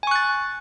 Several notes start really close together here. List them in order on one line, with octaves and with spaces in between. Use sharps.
G#5 C#6 F#6 A6